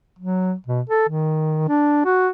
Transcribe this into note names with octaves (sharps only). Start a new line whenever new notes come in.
F#3
B2
A4
D#3
D4
F#4